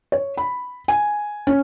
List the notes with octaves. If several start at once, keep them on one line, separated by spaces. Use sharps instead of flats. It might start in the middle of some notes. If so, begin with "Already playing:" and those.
C#5
B5
G#5
C#4